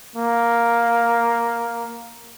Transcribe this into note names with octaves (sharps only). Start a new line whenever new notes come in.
A#3